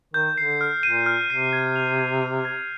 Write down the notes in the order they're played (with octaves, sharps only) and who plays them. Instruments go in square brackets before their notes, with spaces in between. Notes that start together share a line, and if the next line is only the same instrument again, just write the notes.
[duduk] D#3 [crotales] G6
[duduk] D3 [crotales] C7
[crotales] F6
[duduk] A#2 [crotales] D#7
[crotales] F6
[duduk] C3 [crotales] C7
[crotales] G#6
F7
G#6
D#7
G#6